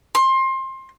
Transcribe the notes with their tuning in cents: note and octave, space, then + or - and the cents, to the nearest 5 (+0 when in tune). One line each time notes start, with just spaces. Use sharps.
C6 +25